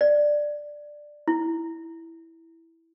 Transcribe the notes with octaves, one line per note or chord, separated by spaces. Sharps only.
D5
E4